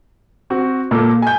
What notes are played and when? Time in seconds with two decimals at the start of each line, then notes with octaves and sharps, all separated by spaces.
0.50 C4 F#4
0.91 A#2 A#3 A4
1.22 G#5 G6